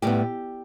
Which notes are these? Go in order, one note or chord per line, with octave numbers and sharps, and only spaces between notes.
A2 G3 B3 G4